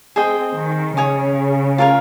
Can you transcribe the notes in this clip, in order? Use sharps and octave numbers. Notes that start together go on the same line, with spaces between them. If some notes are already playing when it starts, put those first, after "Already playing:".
C4 G#4 C5 D#5 G5
D#3
C#3 C#5 G#5 D#6
F4 A#4 C#5